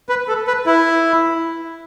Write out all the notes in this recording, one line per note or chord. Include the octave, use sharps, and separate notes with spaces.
B4
A4
B4
E4